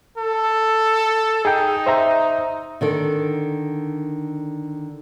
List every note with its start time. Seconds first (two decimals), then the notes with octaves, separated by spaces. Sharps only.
0.18 A4
1.45 D#4 G#4 G5
1.86 C5 E5 A#5
2.81 D3 D#3 A4